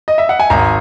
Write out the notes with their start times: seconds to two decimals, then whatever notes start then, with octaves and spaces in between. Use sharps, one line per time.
0.08 D#5
0.18 E5
0.29 F#5
0.40 G#5
0.50 G#1 A#5